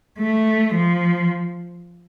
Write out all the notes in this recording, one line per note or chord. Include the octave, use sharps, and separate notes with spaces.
A3
F3